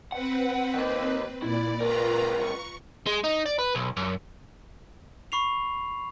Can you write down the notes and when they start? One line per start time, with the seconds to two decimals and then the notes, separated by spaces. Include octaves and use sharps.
0.12 C4 B4 F#5
0.74 D#3 A#3
1.42 A#2 E4 D5
1.81 C#2 F4 A#4 B4 A#5
2.37 C#6
3.06 G#3
3.24 D#4
3.46 D5
3.59 B4
3.75 B1
3.97 F#2
5.32 B5 C#6 C7 F7